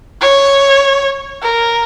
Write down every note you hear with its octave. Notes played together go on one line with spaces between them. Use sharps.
C#5
A#4